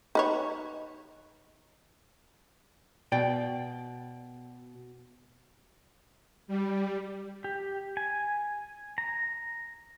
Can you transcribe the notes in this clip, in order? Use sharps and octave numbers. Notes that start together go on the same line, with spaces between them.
D#4 B4 C#5
B2 D5 G5
G3
G4
G#5
A#5